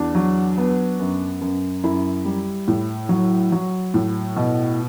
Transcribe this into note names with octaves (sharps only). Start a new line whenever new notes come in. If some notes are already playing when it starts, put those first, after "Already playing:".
Already playing: E2 D4
F#3
B3
F#2
F#2
F#2 E4
G3
A2
F#3
F#3
A2
B2